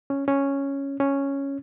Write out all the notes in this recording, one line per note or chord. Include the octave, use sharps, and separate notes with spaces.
C#4
C#4
C#4